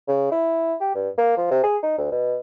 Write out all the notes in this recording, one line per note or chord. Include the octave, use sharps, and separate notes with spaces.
C#3
E4
G4
G2
A#3
F3
C3
G#4
D#4
D2
B2